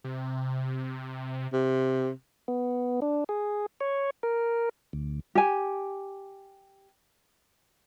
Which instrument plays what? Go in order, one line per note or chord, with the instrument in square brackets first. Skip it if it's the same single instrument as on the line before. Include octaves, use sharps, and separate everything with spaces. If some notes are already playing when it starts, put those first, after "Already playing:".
[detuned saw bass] C3
[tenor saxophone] C3
[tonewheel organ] B3
D4
G#4
C#5
A#4
D2
[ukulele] G4 G#5